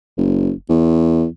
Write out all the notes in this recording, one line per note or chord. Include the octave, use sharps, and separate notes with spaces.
F#1
E2